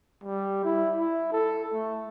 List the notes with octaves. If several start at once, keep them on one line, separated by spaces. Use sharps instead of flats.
G3
E4
E4
A4
A3